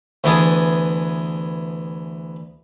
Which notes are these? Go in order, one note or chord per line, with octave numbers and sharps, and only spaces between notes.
D2 E3 B3 G#4 A5